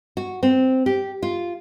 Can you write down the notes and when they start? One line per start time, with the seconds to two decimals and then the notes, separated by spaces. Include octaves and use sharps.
0.17 F#4
0.43 C4
0.86 G4
1.23 F4